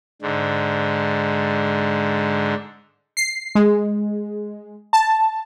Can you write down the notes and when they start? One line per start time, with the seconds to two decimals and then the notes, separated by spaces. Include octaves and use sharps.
0.22 G#2 D3
3.17 C7
3.55 G#3
4.93 A5